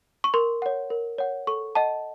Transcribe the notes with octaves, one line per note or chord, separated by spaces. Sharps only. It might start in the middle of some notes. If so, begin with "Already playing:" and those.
C#6
A#4 C6
C#5 F#5
A#4
C#5 F#5
A4 C#6
D#5 F#5 A5